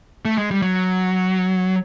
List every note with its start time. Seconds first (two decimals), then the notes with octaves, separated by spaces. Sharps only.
0.25 A3
0.38 G#3
0.51 G3
0.62 F#3